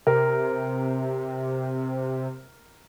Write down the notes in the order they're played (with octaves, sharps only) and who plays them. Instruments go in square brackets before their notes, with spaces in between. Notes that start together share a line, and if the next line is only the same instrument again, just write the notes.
[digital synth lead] C3 [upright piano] A#4